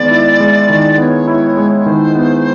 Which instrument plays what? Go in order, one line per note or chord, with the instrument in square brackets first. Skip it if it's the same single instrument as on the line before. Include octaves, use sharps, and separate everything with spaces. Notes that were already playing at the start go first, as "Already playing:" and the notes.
Already playing: [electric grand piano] D#3 G#3 B3 [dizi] D5
[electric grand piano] E4
G#3
D#3
[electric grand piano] B3 [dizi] D5
[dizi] C#5
[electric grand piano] E4
G#3
[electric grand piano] D#3 [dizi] C5
[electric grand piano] B3